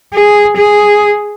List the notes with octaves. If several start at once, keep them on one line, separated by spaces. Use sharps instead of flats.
G#4
G#4